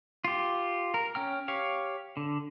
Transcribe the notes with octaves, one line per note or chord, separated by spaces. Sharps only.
F4 G4
A#4
C#4 G5 F6
G4 C#5 F5
D3